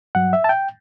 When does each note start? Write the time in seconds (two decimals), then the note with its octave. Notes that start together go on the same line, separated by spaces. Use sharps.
0.15 G2 F#3 F#5
0.33 E5
0.44 A5
0.49 G5